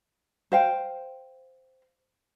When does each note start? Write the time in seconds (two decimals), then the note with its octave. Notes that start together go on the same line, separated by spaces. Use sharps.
0.52 C5 F5 G5